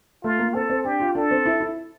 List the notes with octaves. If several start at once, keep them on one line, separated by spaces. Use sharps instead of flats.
A3 F4
A#3
C4 A4
C4
D4 G4
F4
D4 A4
C4
E4
E4